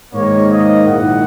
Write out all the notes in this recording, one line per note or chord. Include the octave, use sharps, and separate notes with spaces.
G#2 D#3 A#3 C#5
D#5
A#1 G#2 D#3 A#3 E4 F#5